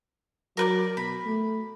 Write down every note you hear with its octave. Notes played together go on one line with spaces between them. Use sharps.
F#3 A#4 B4 D5
B2 B5
A3